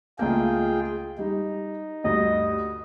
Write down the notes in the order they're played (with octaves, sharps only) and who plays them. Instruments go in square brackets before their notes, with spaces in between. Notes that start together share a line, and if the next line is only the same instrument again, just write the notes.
[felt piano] C#2 A3 A#3 [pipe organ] F4 G#4 G5
[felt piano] G3 [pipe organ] D#4
[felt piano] D2 G2 [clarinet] D#5